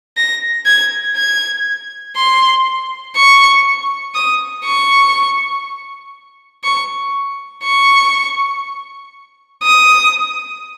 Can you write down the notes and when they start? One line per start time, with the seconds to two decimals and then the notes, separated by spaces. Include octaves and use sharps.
0.17 A#6
0.66 G#6
1.16 G#6
2.16 C6
3.16 C#6
4.15 D#6
4.65 C#6
6.64 C#6
7.64 C#6
9.63 D#6